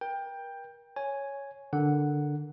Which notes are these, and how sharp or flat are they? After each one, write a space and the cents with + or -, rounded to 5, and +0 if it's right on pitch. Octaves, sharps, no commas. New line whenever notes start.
A#4 +35 G5 +15
C#5 +0 G#5 +0
D3 +0 A#4 +0 F#5 +0